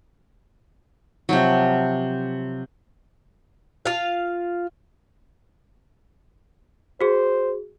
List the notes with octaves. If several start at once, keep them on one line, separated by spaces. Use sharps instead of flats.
C3 F3 F#3
F4 F5
F#4 G#4 C5